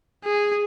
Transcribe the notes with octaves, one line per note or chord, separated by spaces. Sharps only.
G#4